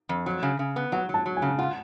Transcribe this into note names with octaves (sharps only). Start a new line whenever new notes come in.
F2
F#3
C#3
C#3
B3
F#3 F#5
F#3
A5
F#3
G#5
C#3
F4 F#5